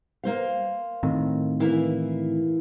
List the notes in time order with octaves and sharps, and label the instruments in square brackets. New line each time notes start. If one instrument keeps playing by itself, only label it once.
[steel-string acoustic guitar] A#3 C5 F5
[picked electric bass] A2 D#3 C4
[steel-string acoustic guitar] E3 A#3 E4